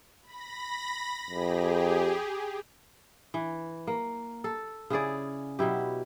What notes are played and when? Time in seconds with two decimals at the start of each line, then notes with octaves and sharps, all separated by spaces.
0.23 B5 A#6
1.31 F2 G4 G#4
3.34 E3
3.87 A#3
4.44 A4
4.90 C#3 E4 G#4 D5
5.59 B2 F#3 E4 G4